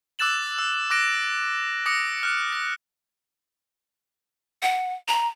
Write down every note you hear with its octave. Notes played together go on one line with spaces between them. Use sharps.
D6 E6 F#6 A6 E7 F#7
E6
D6 F#6 A#6 D7 E7
D6 D#6 A#6 C#7
F6 F#6
A#6
F#5
A#5